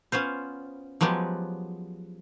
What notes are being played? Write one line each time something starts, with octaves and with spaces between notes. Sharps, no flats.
B3 C#4 F4 C5
F3 F#3 G#3 B3 G4